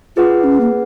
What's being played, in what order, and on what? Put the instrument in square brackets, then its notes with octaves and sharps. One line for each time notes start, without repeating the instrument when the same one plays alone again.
[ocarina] F4 [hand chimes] G#4 B4 F#5
[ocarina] C#4
A#3